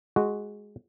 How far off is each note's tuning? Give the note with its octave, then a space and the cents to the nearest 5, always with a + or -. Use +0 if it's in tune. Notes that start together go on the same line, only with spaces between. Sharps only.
G#3 +0 F#4 +0